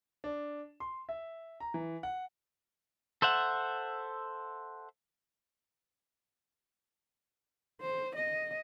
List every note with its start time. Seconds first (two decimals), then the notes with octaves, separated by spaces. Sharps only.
0.24 D4
0.80 C6
1.09 E5
1.60 A#5
1.74 E3
2.03 F#5
3.22 A4 C5 E5 F#5
7.81 C5
8.15 D#5